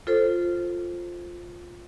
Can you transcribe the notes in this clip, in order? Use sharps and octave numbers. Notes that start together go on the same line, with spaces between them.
F4 A4 C5